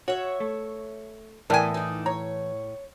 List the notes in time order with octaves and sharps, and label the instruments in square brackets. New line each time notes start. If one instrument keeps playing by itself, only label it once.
[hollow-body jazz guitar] F#4 [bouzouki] C#5 E5
[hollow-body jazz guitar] A3
[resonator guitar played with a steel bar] A2 G#5 [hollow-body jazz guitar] E3 [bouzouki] A3 B3 [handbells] A#4 D5 G5
[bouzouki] D4 D#4
[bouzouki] C#5 [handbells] A#5